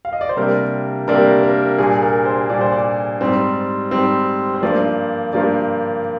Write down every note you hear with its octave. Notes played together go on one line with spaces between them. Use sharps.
F5
D#5
D5
C5
C3 G3 A#3 D4 A#4
C3 G3 A#3 D4 A#4
A#4
A#2 G3 D4 G#4
A#4
C5
A#2 G3 D4 D5
C5
D5
G#2 G3 C4
G#2 G3 C4
C5
G2 F3 A#3 D5
G2 F3 A#3 D5